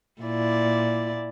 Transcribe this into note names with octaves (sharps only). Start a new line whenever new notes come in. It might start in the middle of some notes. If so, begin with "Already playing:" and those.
A#2 E4 D5